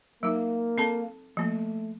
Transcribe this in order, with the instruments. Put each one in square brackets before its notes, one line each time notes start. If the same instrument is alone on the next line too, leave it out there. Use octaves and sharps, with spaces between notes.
[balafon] F#3 D#4 [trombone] A#3
[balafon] C4 A4 A5
[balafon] F3 A#3 [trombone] A3